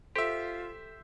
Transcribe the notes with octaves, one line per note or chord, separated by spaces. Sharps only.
F4 G4 A4 C5 E5